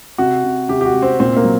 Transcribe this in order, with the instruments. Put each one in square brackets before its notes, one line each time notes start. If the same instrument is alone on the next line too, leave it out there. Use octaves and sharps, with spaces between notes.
[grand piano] C3 F#4
C3
C3 G4
G4
F#4
C3
C4
A#2 C4
A#3
F#3